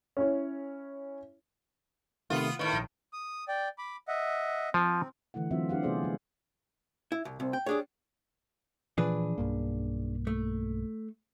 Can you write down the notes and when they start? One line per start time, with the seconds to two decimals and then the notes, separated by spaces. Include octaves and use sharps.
0.17 C#4 E4 C#5
2.30 C3 D#3 A3 B3 F4
2.59 A2 D#3 B4 C#6
2.73 A#1
3.13 D#6
3.48 D5 G5
3.78 B5 D6
4.08 D#5 E5 F#5
4.74 F3 C4
5.34 D3 E3 A3 E4 F#5
5.51 E3 F#3 C4 F4 E5
5.69 D4 F4 G4 F5 F#5
5.83 C3 A3 B3 G#4 C5 D5
6.03 G3 G#3
7.12 E4
7.25 C2
7.40 C2 C4
7.53 G5
7.66 G3 D4 G#4 C#5
8.98 A#2 E3 F3 D4 G#4 B4
9.38 B1 G2 A#3
10.27 A3